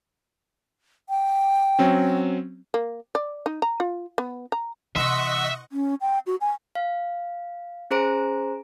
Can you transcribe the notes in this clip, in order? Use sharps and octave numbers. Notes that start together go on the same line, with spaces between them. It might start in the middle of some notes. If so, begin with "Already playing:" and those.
G5
F#3 C4 C#4
A#3
D5
D#4
A#5
F4
B3
A#5
C3 E3 D#5 E5 F#5 C6 C#6
C#4
G5
F#4
G#5
F5
C#4 G#4 C5 A#5 D7